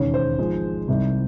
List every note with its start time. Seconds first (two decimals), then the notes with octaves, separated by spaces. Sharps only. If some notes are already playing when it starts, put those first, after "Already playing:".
Already playing: E1 D#2 C#3 C#5
0.14 C5
0.38 G#1 G#2 F3 G#3
0.88 C2 C3 D#3 G3